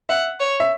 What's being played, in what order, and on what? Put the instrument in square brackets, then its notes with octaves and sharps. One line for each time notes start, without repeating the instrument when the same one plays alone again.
[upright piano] E5 [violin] F#5
[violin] C#5
[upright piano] E5